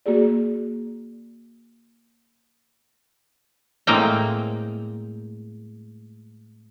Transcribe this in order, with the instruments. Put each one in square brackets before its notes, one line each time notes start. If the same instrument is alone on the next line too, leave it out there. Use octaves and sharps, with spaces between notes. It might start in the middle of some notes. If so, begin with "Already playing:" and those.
[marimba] A#3 F#4 G#4 D5
[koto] A2 G#3 A#3 C4 G5 A#5